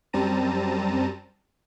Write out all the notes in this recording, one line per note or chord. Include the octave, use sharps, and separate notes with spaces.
F#2 G3 C4 A5 A#5 D#7